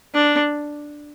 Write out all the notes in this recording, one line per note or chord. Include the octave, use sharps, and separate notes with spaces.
D4